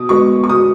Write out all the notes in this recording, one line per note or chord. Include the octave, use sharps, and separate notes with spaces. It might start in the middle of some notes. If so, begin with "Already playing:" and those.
Already playing: B2 D#6
G#3 B3 C#6
C#6
B2 D#6